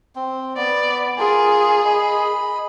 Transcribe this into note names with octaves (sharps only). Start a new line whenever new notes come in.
C4
B3 D5
F4 G#4 A#4
D#5 B5